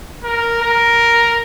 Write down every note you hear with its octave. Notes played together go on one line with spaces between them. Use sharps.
A#4
A#4